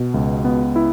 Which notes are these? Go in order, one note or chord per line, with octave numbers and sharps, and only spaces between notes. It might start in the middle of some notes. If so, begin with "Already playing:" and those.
Already playing: B2
C#2
B3
E4